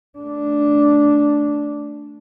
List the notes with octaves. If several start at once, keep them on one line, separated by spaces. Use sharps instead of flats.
A3 D4